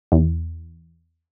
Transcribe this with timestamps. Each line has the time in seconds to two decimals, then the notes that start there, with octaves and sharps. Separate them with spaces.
0.12 E2